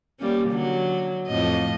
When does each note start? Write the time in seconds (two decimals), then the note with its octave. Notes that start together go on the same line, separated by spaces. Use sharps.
0.20 G3 A#3 C#4
0.50 D3 F#3
1.27 F2 A2 D#5